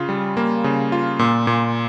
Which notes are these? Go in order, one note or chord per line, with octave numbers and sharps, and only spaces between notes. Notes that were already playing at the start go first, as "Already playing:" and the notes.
Already playing: C#3 F4
G3
A#3
C#3
F4
A#2
A#2